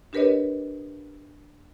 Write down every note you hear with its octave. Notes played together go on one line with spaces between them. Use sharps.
D4 G4 A#4 B4 C#5 D#5